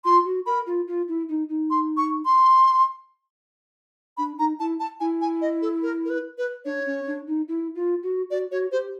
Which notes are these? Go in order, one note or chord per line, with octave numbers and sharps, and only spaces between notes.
F4 C6
F#4
A#4 B5
F4
F4
E4
D#4
D#4
C6
C#6
C6
D4 B5
D#4 A#5
E4 A5
A5
E4 G#5
G#5
D#5
A4
A#4
A#4
B4
B4
D4 C#5
C#4
D4
D#4
E4
F4
F#4
F#4 D5
F#4 C#5
G4 C5